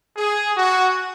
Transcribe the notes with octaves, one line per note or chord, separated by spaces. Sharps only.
G#4
F#4